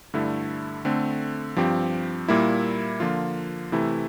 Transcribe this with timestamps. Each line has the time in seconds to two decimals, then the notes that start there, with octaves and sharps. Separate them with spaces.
0.14 G2 D3 A3 E4
0.85 D3 A3 C4
1.57 G2 F3 C4 G4
2.28 A#2 G3 A#3 E4
3.00 D3 F3 A#3 F4
3.72 C3 E3 A3 E4